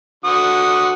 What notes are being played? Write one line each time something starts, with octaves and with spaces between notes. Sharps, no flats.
D3 F#4 D#6